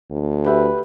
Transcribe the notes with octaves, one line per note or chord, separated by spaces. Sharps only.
D2
G4 B4 E5